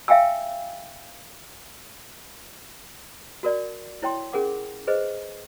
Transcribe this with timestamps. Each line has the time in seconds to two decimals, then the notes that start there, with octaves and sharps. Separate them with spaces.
0.08 E5 F5 G5 G#5 E6
3.43 F#4 A#4 D5
4.02 E4 C#5 G5 C6
4.33 C#4 G#4 A#4 F#5 D6
4.87 G#4 B4 C5 D#5